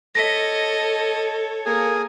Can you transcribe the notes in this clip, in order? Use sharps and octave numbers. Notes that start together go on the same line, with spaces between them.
A4 C#5 D#5 A#6 B6
A#3 G#4 G#5